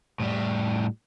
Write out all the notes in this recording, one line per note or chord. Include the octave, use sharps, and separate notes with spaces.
A2 G3